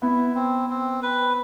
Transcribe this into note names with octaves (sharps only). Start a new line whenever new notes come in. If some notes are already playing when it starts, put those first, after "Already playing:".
B3 E4
C4
C4
B4